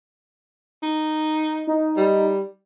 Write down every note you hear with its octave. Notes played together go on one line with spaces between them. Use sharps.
D#4
D#4
G3